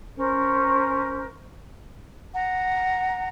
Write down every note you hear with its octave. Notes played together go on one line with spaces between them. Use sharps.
C#4 A#4 C5
F#5 A#5